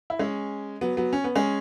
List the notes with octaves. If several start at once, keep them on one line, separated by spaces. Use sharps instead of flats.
E4
G#3 C#4
F#3 B3
F#3 B3
C#4
B3
G#3 C#4